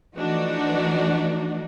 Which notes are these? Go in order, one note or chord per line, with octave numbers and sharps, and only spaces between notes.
E3 F3 A3 D4 D#4 F#4